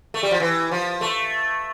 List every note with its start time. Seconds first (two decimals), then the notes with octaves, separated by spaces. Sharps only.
0.14 A3
0.23 G3
0.31 F3
0.40 E3
0.71 F3
1.01 A3